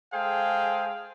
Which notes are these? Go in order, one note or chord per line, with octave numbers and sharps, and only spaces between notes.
G#3 G#4 A4 C5 F5 G5